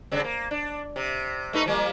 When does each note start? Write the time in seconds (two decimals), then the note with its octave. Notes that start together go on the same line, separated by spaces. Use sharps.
0.11 G2 C#3 C4
0.24 A#3
0.51 D4
0.96 C3
1.53 A3 D#4 B4
1.66 F3 G3 A#3